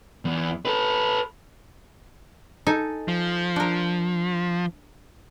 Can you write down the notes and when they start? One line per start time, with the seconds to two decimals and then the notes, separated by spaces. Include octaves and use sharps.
0.25 E2
0.65 A4 B4
2.67 D#4 A4 G#5
3.08 F3
3.56 D4 A#4